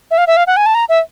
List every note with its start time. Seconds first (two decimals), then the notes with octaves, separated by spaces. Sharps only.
0.11 E5
0.18 F5
0.27 E5
0.37 F5
0.47 F#5
0.57 G#5
0.66 A5
0.75 A#5
0.89 E5